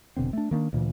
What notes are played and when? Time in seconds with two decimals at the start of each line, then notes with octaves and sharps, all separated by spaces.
0.16 F1 B2 D3 C4
0.33 A3 D4
0.51 D#3 A#3 C#4 D4
0.73 D2 A#2 D#3 E3